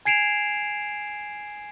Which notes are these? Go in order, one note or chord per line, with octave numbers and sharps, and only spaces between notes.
G#5 G#6 C7 D7 E7 F7